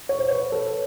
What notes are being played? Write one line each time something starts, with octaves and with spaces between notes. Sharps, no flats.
C#5
C5
B4 C#5
A4 B4